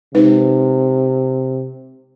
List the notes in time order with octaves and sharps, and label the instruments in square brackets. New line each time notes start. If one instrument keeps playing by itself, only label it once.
[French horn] C3 [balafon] G#3 D#4 B4